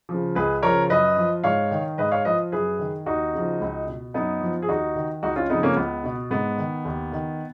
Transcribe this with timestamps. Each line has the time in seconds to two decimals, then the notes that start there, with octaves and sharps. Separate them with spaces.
0.09 C#3 F3
0.35 C#2 G#4 B4
0.62 C#3 F3 A#4 C#5
0.90 F#2 B4 D#5
1.17 F3
1.44 G#2 C#5 F5
1.71 D#3
1.98 G#2 B4 D#5
2.12 C#5 F5
2.25 F3 B4 D#5
2.52 F#2 G#4 B4
2.79 D#3
3.06 D#2 D#4 F#4
3.33 C#3 F3
3.61 C#2
3.87 B2
4.14 F#2 B3 D#4
4.41 F3
4.62 G#4
4.68 D#2 D#4 F#4
4.96 D#3
5.23 C#2 D#4 F#4
5.36 C#4 F4
5.50 C#3 F3 B3 D#4
5.63 A#3 C#4
5.77 C#2 B3
6.04 B2
6.31 G#2 B3
6.58 D#3
6.85 D#2
7.12 D#3